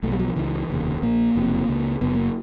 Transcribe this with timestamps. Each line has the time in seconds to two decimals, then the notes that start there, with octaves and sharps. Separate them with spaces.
0.03 B1 A3
0.07 B2 G3
0.19 F#3
0.28 F3
0.36 C#2 C#3 E3
0.70 F1 D#2 C#3
1.02 A#1 A#2 A#3
1.35 F#1 F2 C3
1.69 C#2 C#3
2.01 F#1 F#2 C#3 B3
2.15 A#3